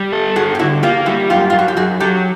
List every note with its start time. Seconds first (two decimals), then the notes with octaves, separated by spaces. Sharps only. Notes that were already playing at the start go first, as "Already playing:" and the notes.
Already playing: G3
0.12 A4
0.36 G2 F#4 G#4
0.55 G4
0.59 D3 E4 F#4
0.83 A#3 F4 G4
1.06 G3 E4 F#4
1.30 F#2 F4 G4
1.50 F#2 F4
1.59 F#4
1.68 G4
1.77 F#2 F#4 G#4
2.00 F#3 G4 A4